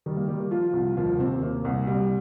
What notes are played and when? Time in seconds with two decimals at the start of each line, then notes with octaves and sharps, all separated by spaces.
0.06 D#3 G3
0.17 A#3
0.28 D#3 G3
0.40 A#3
0.51 F3 F4
0.73 C2
0.97 D#2 F3 F4
1.19 D#2 C3 C4
1.42 C3 A#3
1.65 C2
1.87 C2 G3